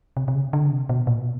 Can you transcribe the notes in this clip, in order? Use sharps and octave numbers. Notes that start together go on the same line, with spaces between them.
C3
C3
C#3
D3
C#3
C3
B2
A#2
B2